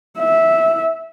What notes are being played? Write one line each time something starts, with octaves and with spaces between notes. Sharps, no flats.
E5